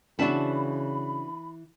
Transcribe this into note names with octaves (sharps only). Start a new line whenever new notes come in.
C#3 E3 B3 D4 F#4 A5 B5